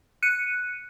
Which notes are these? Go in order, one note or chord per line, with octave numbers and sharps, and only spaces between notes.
F#6 C#7 D#7